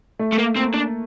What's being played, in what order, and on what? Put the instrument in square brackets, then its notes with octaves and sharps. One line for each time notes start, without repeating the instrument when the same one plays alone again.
[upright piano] A3
[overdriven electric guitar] A3
A#3
[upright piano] A#3 [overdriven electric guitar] C4
[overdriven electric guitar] D4